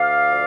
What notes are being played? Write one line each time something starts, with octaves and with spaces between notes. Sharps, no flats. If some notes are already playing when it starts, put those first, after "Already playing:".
Already playing: D2 D5 F5
F3